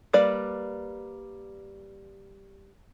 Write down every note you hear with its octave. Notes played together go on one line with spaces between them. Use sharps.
G3 A#3 B4 D5